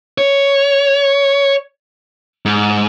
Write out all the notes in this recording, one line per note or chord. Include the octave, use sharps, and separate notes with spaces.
C#5
G#2